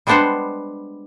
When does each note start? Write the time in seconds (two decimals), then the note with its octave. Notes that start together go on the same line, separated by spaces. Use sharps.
0.07 G3 G#3 B3 D4 C5 F#5